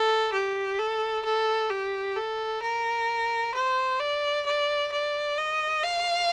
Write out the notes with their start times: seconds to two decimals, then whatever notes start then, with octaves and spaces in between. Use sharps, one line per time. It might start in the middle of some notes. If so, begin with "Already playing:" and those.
Already playing: A4
0.33 G4
0.79 A4
1.25 A4
1.70 G4
2.16 A4
2.62 A#4
3.54 C5
4.00 D5
4.46 D5
4.92 D5
5.38 D#5
5.83 F5